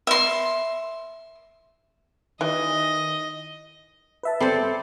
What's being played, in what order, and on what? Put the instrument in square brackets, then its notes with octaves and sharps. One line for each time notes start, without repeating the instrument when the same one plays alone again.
[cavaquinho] E5 C6
[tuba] D#3 [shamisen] E3 G3 [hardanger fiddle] D#5
[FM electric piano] B4 E5 A5
[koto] G3 C5 [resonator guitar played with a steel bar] C4 A4